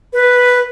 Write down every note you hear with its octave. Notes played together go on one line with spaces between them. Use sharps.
B4